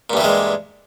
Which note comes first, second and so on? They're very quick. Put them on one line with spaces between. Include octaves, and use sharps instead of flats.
A#2 G2 E3 G3 G#3